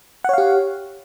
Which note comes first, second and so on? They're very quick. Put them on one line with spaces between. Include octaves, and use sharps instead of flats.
F#5 C#5 F5 G4